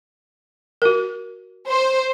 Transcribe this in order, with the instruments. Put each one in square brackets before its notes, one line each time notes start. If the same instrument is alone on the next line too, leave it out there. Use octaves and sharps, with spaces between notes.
[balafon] F#4 A#4
[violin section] C5